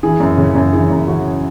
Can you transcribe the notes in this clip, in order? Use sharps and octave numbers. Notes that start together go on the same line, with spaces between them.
E3 G#4
F#2
C#3
G#4
F#2
E3 G#4
F#2
C#3 F#4